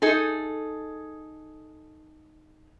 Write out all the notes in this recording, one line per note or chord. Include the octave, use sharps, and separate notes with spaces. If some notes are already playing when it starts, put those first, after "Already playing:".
D#4 G#4 A4